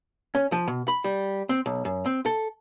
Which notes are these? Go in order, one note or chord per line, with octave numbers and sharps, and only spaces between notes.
C#4
F3
B2
B5
G3
C4
B1
F#2
C4
A4